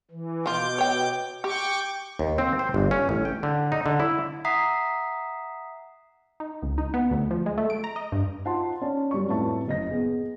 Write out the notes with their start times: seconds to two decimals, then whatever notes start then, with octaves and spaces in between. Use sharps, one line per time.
0.11 E3
0.46 B2 D#3 F4 D6 G6
0.78 C#5 G5
1.44 G4 G5 C#6 D6
2.19 D#2
2.38 C4
2.59 C5
2.74 G1
2.91 C#4
3.09 A1
3.25 G5
3.43 D3
3.72 D#4
3.86 D3
4.00 E4
4.45 E5 F#5 A#5 D#6 B6 C7
6.40 D#4
6.62 C#2
6.78 D#4
6.94 B3
7.11 D2
7.31 F3
7.46 G#3
7.58 A3
7.70 D7
7.84 A#5
7.96 D#5
8.12 G2
8.45 D#4 F4 C5 F#5 A5 C6
8.81 C#4 D5 A5
9.11 F#2 G3 D5 C#6
9.28 F2 A2 B4 E5 A5 C#6
9.67 F#1 D#5 A#6
9.90 B3 G#4